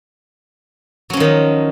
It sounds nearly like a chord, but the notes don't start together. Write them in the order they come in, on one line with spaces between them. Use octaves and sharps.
F#3 C#4 F3 D#3 D#4